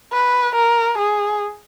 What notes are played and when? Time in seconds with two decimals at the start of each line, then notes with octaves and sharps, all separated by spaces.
0.13 B4
0.56 A#4
0.98 G#4